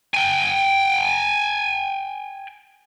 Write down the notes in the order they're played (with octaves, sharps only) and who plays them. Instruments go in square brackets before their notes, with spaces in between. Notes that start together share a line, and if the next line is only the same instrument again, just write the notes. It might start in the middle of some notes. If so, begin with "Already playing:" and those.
[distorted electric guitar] G5 G#5